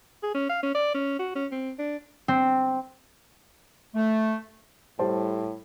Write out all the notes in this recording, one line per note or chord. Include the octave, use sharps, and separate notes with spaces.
G#4
C#4
F5
C#4
D5
C#4
F#4
C#4
C4
D4
C4
A3
A2 G3 C5 A5